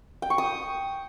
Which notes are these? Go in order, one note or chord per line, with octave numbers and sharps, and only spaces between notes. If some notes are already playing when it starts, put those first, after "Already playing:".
G5
C#6
D#6